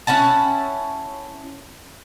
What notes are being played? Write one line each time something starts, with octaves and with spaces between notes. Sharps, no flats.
C#4 E4 F#5 A5